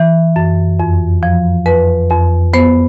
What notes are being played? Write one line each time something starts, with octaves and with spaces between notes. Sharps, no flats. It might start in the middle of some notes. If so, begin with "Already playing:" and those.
Already playing: E3
F#2
F2
F3
F2 B4
F2
B3 C5